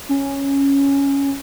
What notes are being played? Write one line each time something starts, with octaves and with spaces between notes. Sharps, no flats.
C#4